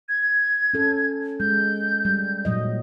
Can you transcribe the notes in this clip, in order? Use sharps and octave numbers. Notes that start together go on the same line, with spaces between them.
G#6
C#4 A4
G#3 G6
G3
A#2 F#3 D#5